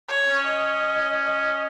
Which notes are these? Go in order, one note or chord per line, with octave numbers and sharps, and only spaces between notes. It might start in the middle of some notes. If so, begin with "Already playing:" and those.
C#5
C#4
D#5
D#5